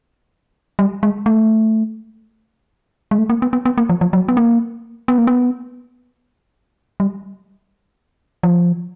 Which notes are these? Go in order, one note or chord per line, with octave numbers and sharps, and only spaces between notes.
G3
G#3
A3
G#3
A3
A#3
B3
B3
B3
A#3
F3
F3
F#3
B3
A#3
B3
A#3
B3
G3
F3